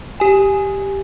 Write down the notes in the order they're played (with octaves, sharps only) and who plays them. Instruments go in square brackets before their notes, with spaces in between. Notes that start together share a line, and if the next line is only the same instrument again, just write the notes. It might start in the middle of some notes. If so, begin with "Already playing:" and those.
[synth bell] G4 G#5